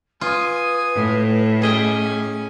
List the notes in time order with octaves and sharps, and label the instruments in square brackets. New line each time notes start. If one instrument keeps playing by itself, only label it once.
[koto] F4 [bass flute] B4 [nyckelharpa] G#5 D#6
[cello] A2
[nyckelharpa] C#4 G#5 [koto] G#4 D#5 G5